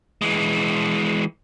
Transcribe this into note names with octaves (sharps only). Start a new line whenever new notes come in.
E3 G#3